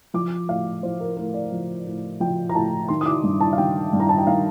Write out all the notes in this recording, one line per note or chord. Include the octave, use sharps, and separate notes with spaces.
F3 D6
A2 F5
F3 C5
A#4
A2 A#4
D5
F3
A2
F3 G5
A#5
A2 A5
D#3 C6
D#6
D6
G2
A5
F5
D#3 G5
G2
A#5
A5
G5
D#3 F5